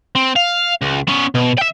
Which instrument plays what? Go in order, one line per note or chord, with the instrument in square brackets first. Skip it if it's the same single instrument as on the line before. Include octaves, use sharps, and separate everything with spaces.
[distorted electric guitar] C4
F5
C#2
B3 C#4
B2
E5 G5